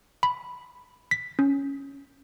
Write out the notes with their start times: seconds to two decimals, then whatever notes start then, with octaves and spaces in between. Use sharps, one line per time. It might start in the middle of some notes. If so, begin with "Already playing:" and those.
0.23 B5
1.11 B6
1.39 C#4